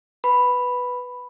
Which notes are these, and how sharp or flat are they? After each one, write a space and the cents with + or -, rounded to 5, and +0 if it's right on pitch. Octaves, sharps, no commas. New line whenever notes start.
B4 +0 B5 +0